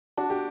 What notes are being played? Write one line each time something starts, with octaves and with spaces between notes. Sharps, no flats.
D4 F#4
G4